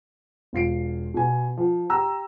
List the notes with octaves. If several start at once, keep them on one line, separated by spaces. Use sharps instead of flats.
E1 F4 C7 D7
B2 G#5
F3
G4 A#5 E6